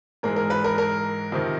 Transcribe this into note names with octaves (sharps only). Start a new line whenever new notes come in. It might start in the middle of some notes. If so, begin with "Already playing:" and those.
G#2 E3 G#3 A#4
A#4
B4
A#4
A#4
F2 C3 D#3